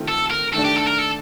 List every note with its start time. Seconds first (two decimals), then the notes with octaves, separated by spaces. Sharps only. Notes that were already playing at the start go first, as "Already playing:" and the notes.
Already playing: D#3 A3 C4 F4
0.08 A4
0.31 A#4
0.53 D#3 A3 D4 A4
0.65 G4
0.76 A4
0.87 A#4
0.99 A4